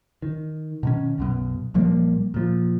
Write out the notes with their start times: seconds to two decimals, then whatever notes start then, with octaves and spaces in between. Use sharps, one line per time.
0.22 D#3
0.83 B2 D#3 C#4
1.18 B1 F#2 B2
1.74 A#1 F3 G3 A#3
2.34 A#2 F3